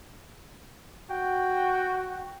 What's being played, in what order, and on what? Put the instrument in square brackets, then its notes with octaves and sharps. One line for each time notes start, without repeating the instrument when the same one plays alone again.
[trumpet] F#4 [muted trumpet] G5